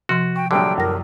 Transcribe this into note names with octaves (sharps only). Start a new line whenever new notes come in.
C3 F3 F#4 C6
G5 C#6
A#1 D3 F#3 G3 G5
F#2 A#4 A#6